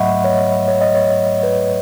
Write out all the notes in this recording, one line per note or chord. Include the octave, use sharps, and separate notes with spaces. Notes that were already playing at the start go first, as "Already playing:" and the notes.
Already playing: G#2 F#3 A3 D#5 E5 F#5 B5 C#6
C#5
D#5
C#5
D#5
C#5
B4